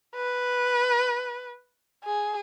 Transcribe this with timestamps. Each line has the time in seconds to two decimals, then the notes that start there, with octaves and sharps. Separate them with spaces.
0.16 B4
2.04 G#4